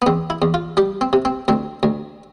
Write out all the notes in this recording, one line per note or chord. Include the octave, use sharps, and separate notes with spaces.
B3
E2 C4
E4
E2
F4
G3 G4
C4
C3
C4
D2 C4
D2